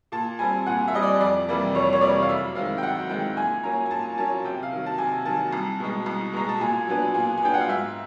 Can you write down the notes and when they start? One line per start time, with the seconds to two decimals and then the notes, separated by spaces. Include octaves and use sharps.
0.12 A#2 A5
0.39 G3 C4 G#5
0.66 A#2 F#5
0.88 E5
0.94 G3 C4 D#5
1.03 D5
1.21 F2 D5
1.47 C3 E3 G3 A#3
1.75 F2 C#5
1.93 C#5
2.01 C3 E3 G3 A#3 D5
2.22 F5
2.29 F#2 E5
2.55 D#3 G#3 C4 F5
2.78 G5
2.83 F#2 F#5
3.09 D#3 G#3 C4 G5
3.36 A#2 G#5
3.63 F#3 A#3 C#4 A#5
3.86 G#5
3.91 A#2 A5
4.17 F#3 A#3 C#4 A5
4.44 C3 G5
4.63 F5
4.72 D#3 F#3
4.86 A5
4.98 C3 G#5
5.25 D#3 F#3 A5
5.52 C2
5.80 B2 G#3
6.06 C2
6.33 B2 G#3 A#5
6.49 A5
6.60 A#2 G#5
6.87 F#3 B3 D4
7.14 A#2 G#5
7.37 G#5
7.42 F#3 B3 D4 G5
7.54 F#5
7.60 F5
7.68 G#2 E5